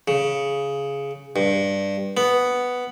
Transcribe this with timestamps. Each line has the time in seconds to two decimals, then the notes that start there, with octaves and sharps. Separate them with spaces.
0.08 C#3
1.36 G2
2.17 B3